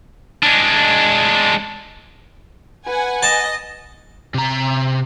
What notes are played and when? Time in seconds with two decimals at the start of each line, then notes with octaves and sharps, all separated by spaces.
0.43 G#3 D4
2.86 B4 F#5 G#5
3.23 D#5 A5
4.34 C3 A#5